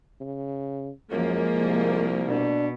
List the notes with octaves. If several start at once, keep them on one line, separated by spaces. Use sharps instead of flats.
C#3
F#2 F3 G#3 A#3
C2
B2 D4